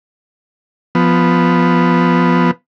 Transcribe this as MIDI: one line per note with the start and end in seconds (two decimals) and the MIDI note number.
0.95 2.51 53
0.95 2.51 59